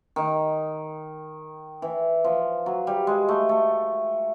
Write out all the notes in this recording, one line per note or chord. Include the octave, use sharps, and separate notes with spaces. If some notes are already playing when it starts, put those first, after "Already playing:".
D#3
E3
F3
F#3
G3
G#3
A3
A3